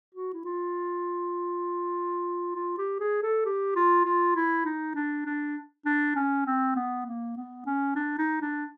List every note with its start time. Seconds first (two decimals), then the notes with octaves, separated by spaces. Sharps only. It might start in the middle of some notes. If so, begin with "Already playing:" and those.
0.15 F#4
0.33 E4
0.45 F4
2.55 F4
2.78 G4
3.00 G#4
3.22 A4
3.45 G4
3.76 F4
4.05 F4
4.35 E4
4.65 D#4
4.95 D4
5.25 D4
5.86 D4
6.15 C#4
6.46 C4
6.76 B3
7.06 A#3
7.36 B3
7.66 C#4
7.95 D4
8.18 D#4
8.41 D4